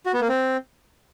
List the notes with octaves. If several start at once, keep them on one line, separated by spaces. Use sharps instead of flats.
F#4
B3
A#3
C4